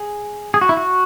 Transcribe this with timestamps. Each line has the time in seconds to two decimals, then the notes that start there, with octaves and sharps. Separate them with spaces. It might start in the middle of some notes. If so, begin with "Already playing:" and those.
Already playing: G#4
0.54 G#4
0.61 F#4
0.69 E4
0.77 F#4